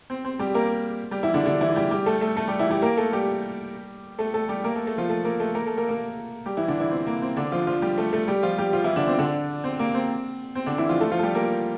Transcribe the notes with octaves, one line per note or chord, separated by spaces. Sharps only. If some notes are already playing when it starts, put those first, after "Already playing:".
C4
C4
G3 G4
A#3 A#4
G3 G4
E3 E4
D3 D4
D3 D4
E3 E4
G3 G4
G3 G4
A3 A4
A3 A4
A3 A4
G3 G4
E3 E4
G3 G4
A#3 A#4
A3 A4
G3 G4
A3 A4
A3 A4
G3 G4
A#3 A#4
A3 A4
A3 A4
F3 F4
A3 A4
A#3 A#4
A3 A4
A#3 A#4
A3 A4
A#3 A#4
A#3 A#4
G3 G4
E3 E4
D3 D4
E3 E4
C4
A#3
C4
D3 D4
F3 F4
F3 F4
G3 G4
A3 A4
A3 A4
G3 G4
F3 F4
G3 G4
F3 F4
E3 E4
D3 D4
C4
D3 D4
C4
A#3
C4
C4
D3 D4
E3 E4
F3 F4
A3 A4
F3 F4
A4
G3 G4
A#3 A#4